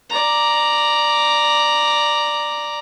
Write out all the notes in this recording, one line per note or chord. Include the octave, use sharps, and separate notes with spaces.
D5 A#5